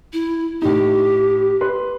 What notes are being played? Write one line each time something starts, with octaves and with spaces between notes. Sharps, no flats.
E4
A2 D#4 G4
B4 C6